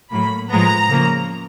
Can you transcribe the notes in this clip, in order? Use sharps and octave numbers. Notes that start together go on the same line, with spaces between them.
A2 F#3 A#3 B5
A2 F3 G#3 B3 A#5
C#3 F3 A#3